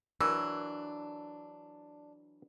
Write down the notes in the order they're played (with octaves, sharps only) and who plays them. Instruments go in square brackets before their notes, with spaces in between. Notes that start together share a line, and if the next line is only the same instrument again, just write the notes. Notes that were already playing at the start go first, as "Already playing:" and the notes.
[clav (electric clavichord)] E3 F#3 [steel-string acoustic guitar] D4 [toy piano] A#4